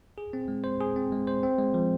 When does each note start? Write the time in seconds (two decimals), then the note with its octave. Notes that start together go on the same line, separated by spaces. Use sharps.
0.18 G#4
0.33 C4
0.48 G#3
0.64 C5
0.81 G#4
0.96 C4
1.12 G#3
1.27 C5
1.43 C4
1.58 G#3
1.74 F3